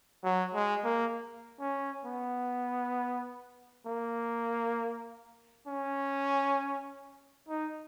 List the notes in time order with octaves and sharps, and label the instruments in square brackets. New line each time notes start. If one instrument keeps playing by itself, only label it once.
[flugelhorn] F#3
G#3
A#3
C#4
B3
A#3
C#4
D#4